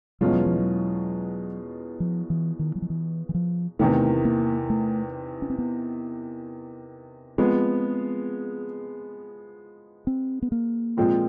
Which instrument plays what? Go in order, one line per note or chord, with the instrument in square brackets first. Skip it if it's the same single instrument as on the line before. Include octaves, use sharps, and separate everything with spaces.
[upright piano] E2 B2 G#3 C#4 F4 [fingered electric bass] G3
[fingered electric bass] F#3
F3
F#3
F3
E3
D#3
F#3
F3
E3
E3
F3
[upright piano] E2 C3 D#3 [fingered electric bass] A3
[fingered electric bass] A#3
A3
C#4
C4
B3
[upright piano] F3 G#3 B3 [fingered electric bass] C4
[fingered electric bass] C4
B3
A#3
[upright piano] A#2 F3 G#3 C4 F4